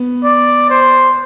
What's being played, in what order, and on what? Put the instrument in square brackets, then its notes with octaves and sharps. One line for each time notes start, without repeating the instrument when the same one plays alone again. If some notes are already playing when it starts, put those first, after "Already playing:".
Already playing: [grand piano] B3
[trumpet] D5
C5